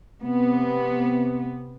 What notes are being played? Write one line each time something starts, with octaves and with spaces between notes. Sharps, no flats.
C3 B3